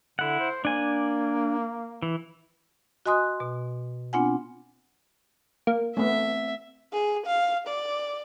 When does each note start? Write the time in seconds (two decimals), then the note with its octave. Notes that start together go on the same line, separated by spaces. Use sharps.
0.19 D3 E4 F#5
0.40 C5
0.65 A#3 D4 G#5
2.02 E3
3.06 F#4 D#5 G#5 C6 D#6 F#6
3.40 B2
4.13 B3 C4 D4 F4 F#5 G#5
5.67 A#3
5.97 A3 B3 C4 E5
6.92 G#4
7.26 F5
7.67 D5